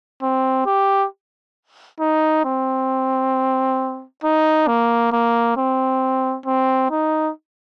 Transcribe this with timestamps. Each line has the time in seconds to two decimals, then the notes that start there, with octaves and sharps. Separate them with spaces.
0.22 C4
0.66 G4
2.00 D#4
2.45 C4
4.24 D#4
4.67 A#3
5.12 A#3
5.57 C4
6.46 C4
6.91 D#4